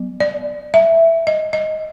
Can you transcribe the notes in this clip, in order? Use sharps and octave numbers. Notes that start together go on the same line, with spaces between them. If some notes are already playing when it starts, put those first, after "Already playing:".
Already playing: F#3 B3
D5
E5
D#5
D#5